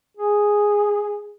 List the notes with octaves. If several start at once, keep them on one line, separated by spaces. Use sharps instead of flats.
G#4